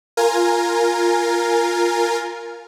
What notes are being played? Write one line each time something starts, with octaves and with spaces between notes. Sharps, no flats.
F4 A#4 G#5